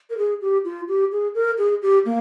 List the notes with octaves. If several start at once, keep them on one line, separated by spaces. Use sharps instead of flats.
A#4
G#4
G4
F4
G4
G#4
A#4
G#4
G4
A#3